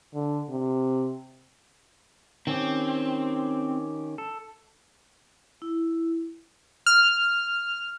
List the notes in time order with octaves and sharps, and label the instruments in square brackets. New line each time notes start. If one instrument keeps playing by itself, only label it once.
[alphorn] D3
C3
[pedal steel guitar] D#3 C#4 G4 [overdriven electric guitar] C4
[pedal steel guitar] A4
[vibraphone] E4
[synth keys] F6